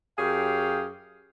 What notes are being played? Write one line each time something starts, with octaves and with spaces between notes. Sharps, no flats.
F#2 G4 G#4 C#5 F5 G5